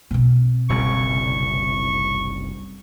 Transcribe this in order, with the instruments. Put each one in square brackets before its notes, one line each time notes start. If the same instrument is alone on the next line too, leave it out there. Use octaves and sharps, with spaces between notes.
[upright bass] B2 C4
[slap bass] F#1 C2 C#3 [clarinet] C#6